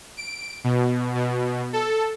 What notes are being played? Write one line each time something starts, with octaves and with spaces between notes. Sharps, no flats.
D7
B2
B2
A4